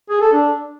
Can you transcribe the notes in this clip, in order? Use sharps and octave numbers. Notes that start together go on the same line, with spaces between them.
G#4
A4
D4